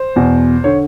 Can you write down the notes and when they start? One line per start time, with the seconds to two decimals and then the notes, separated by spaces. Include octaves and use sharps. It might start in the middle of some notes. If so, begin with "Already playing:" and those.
Already playing: C5
0.16 E2 B2
0.64 D3 C#5